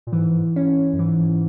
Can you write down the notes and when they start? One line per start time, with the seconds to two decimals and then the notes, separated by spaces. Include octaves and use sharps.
0.07 A#2
0.12 G#2 E3
0.56 C#4
0.93 F#2
0.99 G#2 E3